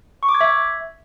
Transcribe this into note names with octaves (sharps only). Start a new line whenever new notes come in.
C#6
D6
G#6
E5